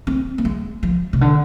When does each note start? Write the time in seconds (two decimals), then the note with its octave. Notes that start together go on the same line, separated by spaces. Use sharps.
0.07 C4
0.38 A3
0.45 G#3
0.83 F3
1.13 C3
1.21 D3